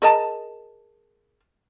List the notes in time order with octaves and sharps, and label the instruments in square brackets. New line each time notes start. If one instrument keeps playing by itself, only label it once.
[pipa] G#4 A#4 D#5 A5